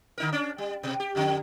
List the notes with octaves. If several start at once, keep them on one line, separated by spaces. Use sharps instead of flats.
D3 D#4 A#4
C#4 D4
G3
B2
G4
F2 D3